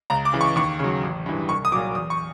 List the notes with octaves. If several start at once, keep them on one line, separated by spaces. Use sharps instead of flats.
C#2 A#5
D6
C#3 E3
C#6
D#2 C#6
C#3 F#3
A1
G2 E3
C2 C#6
D#6
A#2 F#3 D6
E2 D#6
C#6